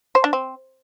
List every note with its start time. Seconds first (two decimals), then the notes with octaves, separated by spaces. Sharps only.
0.15 C5
0.24 D4
0.33 C4